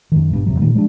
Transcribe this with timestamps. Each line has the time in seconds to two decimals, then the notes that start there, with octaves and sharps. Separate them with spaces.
0.12 F#2 D#3
0.31 G1 G2 B2
0.47 F2 C3 F#3
0.59 A#2 D#3 G3 A#3
0.74 F3 G3 G#3 D4